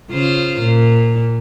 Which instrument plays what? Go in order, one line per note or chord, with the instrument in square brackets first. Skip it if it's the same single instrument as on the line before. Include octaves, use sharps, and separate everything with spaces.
[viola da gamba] C#3 F4 C5
A#2